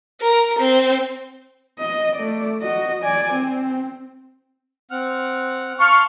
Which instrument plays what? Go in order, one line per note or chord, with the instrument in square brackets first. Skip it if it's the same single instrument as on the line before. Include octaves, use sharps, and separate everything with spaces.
[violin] A#4
C4
[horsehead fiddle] D#5
A3 D5
F#4 D#5
D5 G#5
C4
[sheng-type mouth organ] C4 F#5 F6
[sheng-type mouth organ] F5 A5 C6 [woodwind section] C#6 F6